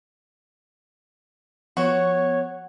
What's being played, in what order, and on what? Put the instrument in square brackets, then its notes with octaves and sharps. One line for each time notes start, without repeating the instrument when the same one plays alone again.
[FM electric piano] F3 B3 [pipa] F#4 [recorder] C#5